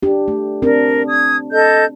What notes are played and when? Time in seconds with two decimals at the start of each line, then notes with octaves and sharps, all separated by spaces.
0.03 D4 G4
0.28 A3
0.62 C4 D4 A#4
1.08 D#6 G#6
1.52 A4 D#5 G6